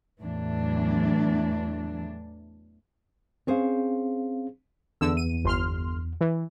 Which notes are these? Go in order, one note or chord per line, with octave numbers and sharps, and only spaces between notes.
E2 A2 E3 F#3 D4
C4 C#4 G#4 C5 F5
E2 D3 E6
D#7
G1 C6 F6
E3